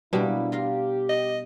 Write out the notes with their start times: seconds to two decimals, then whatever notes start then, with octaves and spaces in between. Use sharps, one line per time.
0.13 B2 G3 A#3 D4 E4
0.52 F4 G4 A#4 F5
1.09 D#5